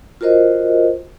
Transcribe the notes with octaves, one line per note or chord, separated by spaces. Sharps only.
F4 F#4 A#4 C5 D#5